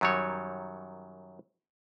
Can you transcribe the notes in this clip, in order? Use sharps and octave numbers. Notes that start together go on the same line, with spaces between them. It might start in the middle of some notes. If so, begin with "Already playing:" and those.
F#2 D#3 F#3 G3 C#5